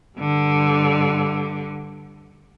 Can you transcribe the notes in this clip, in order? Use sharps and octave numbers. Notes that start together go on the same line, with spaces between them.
G2 D3